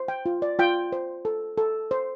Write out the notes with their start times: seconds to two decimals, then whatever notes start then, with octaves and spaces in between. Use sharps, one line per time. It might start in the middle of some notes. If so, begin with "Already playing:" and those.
Already playing: C5
0.08 G5
0.26 F4
0.42 D5
0.59 F4 G5
0.92 C5
1.25 A4
1.58 A4
1.91 C5